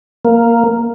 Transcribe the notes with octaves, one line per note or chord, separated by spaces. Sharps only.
A#3